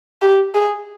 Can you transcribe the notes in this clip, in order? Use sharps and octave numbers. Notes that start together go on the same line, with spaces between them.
G4
G#4